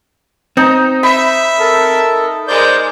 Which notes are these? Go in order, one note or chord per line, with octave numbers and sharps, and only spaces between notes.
C4 D#4 A#5
E5 B5
A4 A#4
G#3 A#4 C5 D5 G6